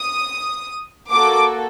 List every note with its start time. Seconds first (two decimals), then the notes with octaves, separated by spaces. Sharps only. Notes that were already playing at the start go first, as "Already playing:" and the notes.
Already playing: D#6
1.10 A#3 F#4 A4 D6